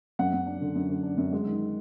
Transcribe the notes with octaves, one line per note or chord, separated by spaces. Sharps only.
F#2 F#5
F#2
D4
D3
F#2
D3
D4
F#2
G#3
D#3